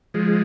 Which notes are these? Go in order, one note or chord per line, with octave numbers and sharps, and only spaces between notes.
F3 G#3